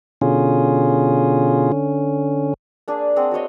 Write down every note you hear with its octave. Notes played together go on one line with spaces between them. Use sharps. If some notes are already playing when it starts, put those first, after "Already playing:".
B2 D3 C#4 F4 G#4
D3 C#4
A#3 D4 G#4
C4 G#4 F#5 G5
F#4 C5 C#5 D#5